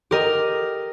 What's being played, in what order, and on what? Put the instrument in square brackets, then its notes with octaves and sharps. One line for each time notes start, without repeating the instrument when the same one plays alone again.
[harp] G4 A#4 D#5